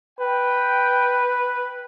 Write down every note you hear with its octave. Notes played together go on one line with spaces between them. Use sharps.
B4 G5